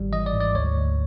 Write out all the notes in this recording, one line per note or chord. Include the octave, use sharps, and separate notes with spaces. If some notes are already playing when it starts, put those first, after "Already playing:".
Already playing: G#1 G3
E3 D#5
D5
G#2
D5
D2 C#5
D2